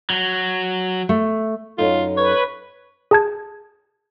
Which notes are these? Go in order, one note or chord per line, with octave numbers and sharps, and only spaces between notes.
F#3
A3
F#2 D#4 F4 A4
B4 C#5
G#4 A5 G#6